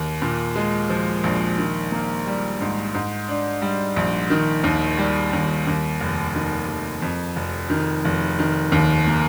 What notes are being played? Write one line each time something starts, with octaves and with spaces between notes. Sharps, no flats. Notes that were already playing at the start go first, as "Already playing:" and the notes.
Already playing: D#2
A#2
G#3
F3
A#1
D#3
A#3
G3
G#2
G#2
D4
G3
A#1
D#3
D#2
G3
D#2
D#2
F1
D#3
F1
F2
F1
D#3
F1
D#3
D#2
A#3